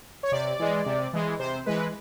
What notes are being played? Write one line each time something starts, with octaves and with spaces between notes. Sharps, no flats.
C#5
C3 D5
E3 G#3
C3
E3 G#3
C3 C5
E3 G#3 B4